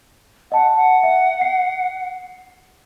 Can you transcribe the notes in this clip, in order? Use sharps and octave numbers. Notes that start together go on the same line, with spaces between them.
D#5 F#5 A5
F#5
E5
C7